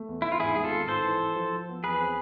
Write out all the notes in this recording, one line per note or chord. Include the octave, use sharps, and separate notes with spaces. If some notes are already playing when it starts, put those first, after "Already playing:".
Already playing: A3
E2
E2 E4
F4
G#2 E4 G#4
G#3 G#4
F4 A4
G#1
G#2 A4 C5
E3
E3
F3
F3
B3
E2 G#4 B4
C4